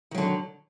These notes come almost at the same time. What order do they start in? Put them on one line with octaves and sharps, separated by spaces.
D#3 F#3 D3